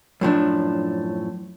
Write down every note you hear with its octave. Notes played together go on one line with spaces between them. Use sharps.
F#2 A2 F3 D4